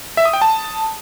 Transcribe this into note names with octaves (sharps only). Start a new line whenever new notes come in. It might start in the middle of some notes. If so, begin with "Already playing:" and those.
E5
D#6
G5
A5